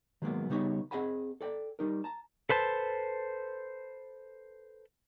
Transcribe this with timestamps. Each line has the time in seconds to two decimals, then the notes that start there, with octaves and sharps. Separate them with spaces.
0.22 D#3 F#3 G#3 A#3 B3
0.50 C#3 G3 B3 D#4 C#5
0.91 C4 G#4 D#5 F#5 G#5 B5
1.41 A4 D5 G5
1.79 G3 D#4 A#4
2.04 A5 A#5
2.49 A4 B4 C5 A5